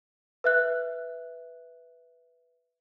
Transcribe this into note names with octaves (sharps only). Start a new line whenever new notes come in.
B4 E5 F#6